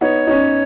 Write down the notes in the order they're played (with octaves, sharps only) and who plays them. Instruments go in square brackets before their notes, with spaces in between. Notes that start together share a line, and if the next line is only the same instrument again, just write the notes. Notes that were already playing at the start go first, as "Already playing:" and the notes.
[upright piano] B3 D#4 [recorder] C#5
[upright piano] D#4
C#4